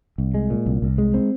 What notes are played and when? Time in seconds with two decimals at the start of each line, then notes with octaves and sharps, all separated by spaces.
0.18 C2
0.34 G#3
0.50 A#2
0.66 C2
0.82 C2
0.98 G#3
1.14 C4